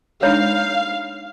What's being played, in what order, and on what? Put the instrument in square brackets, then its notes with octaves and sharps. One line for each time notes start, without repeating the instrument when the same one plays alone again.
[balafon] G#3 D4 D#4 [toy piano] C#5 [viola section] F5